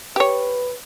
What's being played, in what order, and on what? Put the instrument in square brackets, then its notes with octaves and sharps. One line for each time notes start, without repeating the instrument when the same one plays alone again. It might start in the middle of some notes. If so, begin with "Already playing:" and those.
[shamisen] G4 C#5 [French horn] B4